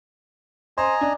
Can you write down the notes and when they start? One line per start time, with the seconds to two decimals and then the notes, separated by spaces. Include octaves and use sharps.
0.78 C5 D#5 G#5 A#5
1.01 D4